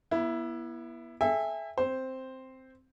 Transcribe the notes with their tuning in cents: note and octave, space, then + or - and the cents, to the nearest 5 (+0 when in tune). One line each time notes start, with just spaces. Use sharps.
B3 -35 E4 +10
A4 -35 E5 +0 G#5 -45
C4 +0 C5 +0